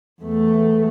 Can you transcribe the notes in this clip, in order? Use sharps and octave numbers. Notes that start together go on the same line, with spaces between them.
E2 A3